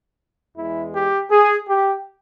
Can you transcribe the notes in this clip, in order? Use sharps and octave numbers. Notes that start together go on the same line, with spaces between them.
E2 E3 G#3 E4
G4
G#4
G4